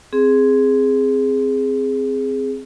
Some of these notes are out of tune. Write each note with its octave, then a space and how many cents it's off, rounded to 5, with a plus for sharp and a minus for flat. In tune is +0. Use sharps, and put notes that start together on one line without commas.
C4 +0 G#4 +0